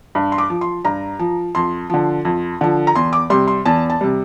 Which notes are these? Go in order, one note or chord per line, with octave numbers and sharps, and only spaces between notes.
G2
C6
D6
F3
C6
G2 A#5
F3
F2 C6
D3 F3
F2
D3 F3
A#5
E2 C6
D6
C3 G3 C6
C6
E2 A5
A5
C3 G3